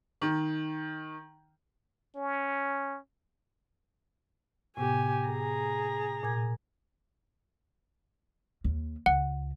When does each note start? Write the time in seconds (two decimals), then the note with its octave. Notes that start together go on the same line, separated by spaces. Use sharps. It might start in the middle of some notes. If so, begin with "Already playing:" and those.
0.21 D#3
2.16 C#4
4.77 A2 C3 B3 G4 G#5
5.29 G#4 A#5
6.23 A#2 G#5 G#6
8.64 D#2
9.06 C#2 F#5